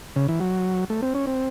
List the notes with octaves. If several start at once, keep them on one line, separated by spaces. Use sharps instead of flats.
C#3
E3
F#3
A3
C4
C#4
C4